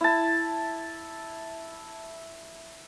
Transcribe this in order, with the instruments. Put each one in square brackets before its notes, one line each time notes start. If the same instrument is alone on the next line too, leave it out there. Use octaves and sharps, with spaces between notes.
[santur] E4 A5